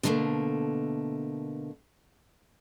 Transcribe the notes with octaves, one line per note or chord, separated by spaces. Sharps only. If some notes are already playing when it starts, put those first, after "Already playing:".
B2 D3 F#3 G3 A3 A#3